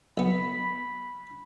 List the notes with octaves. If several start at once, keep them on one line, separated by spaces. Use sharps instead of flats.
B1 B3 B5